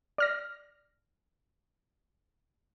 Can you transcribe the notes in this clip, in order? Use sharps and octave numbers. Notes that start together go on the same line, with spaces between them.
D5 F6 A#6